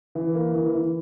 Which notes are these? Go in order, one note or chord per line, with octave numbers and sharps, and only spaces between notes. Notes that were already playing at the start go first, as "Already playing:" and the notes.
E3
A#3
E3
E3